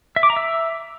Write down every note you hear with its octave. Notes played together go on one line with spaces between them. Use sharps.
E5
D6
A#5
E5